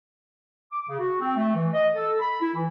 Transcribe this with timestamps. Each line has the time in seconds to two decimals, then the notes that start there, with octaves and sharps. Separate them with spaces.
0.70 D6
0.87 C#3
0.99 F#4
1.20 C4
1.35 A3
1.55 E3
1.73 D#5
1.94 A4
2.20 B5
2.40 E4
2.54 E3